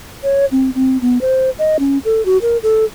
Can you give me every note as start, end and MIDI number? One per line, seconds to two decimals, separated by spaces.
0.24 0.45 73
0.52 0.70 60
0.75 0.98 60
1.02 1.18 59
1.21 1.50 72
1.59 1.77 75
1.79 1.98 61
2.05 2.24 69
2.25 2.38 66
2.42 2.57 70
2.63 2.85 69